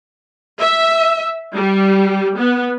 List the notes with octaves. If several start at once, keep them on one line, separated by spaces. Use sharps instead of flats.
E5
G3
B3